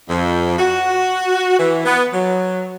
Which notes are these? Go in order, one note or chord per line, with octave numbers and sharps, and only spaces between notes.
F2
F#4
E3
B3
F#3